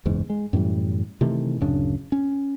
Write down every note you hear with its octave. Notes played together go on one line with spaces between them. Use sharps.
F#1 E2 G#2
G#3
F#2 A2 E3 G3
C3 D#3 E3 A3
D1 F#2 C#3 D4
C#4